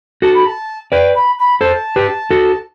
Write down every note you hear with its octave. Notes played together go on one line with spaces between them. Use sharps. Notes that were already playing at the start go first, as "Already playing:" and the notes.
F#4 A4 A5
B5
A5
B4 D5 G5
B5
B5
A4 C5 A5
G4 B4
F#4 A4